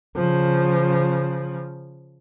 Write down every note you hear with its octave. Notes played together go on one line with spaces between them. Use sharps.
C#3 F3